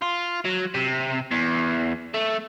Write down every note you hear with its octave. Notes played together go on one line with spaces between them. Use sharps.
F4
F#3
C3
E2
A3